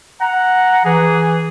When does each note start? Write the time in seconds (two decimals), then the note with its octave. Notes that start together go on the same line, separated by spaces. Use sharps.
0.21 F#5 A#5
0.85 E3 G#4